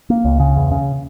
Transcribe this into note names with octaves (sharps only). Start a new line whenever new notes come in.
A#3
C#2
C#3
E2
C#3